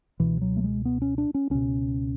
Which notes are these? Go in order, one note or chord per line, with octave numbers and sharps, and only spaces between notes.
C#2 B2 E3
F#3
A3
G#3
B3
C#4
D4
C#4
C#2 B2 C#4